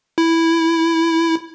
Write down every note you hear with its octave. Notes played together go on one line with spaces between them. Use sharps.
E4